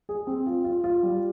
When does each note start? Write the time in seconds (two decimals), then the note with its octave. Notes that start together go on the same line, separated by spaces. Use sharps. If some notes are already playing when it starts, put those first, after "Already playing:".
0.09 G#4
0.27 C4
0.46 F4
0.64 F4
0.84 F4
1.03 G3